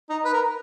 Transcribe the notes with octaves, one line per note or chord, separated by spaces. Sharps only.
D#4
B4
A#4